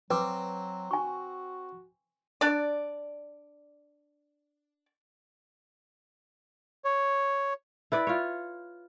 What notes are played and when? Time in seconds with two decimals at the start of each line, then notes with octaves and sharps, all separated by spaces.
0.10 F#3 C4 B4 D6
0.91 F#4 G#5 C#6
2.41 D4 D5
6.85 C#5
7.92 E4 B4 D5
8.07 F4 C#5